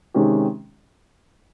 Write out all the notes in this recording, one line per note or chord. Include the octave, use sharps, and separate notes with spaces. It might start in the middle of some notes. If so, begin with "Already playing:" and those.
C3 D#3 G#3 C#4 G4